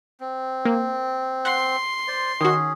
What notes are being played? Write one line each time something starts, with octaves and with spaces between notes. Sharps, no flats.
C4
A#3
F#5 C6
C5 D5
D#3 C#4 F#4 G#4